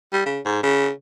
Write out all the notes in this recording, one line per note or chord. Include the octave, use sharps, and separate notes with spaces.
G3
C#3
G#2
C#3